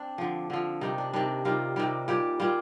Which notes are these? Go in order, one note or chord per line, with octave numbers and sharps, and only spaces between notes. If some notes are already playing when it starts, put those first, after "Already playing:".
Already playing: C4 D4
D3 F3
D3 F3
C3 D#3 G3 D#4
D4
C3 D#3 G3 D4
C3 D#3 G3 F4
C3 D#3 G3
A#2 G3 G4
A#2 G3 F4